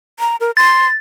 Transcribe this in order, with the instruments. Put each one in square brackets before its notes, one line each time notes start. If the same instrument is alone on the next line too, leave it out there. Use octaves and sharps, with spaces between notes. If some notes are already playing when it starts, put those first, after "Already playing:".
[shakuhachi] A#5
A#4
[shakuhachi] C6 [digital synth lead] A6